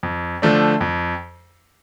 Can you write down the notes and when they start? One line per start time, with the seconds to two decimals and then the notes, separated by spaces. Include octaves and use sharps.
0.03 F2
0.42 D3 F3 A3 D4
0.81 F2